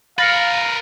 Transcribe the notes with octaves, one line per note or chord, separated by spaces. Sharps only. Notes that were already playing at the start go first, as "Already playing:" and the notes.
A#4 B4 F5 A6 A#6 C#7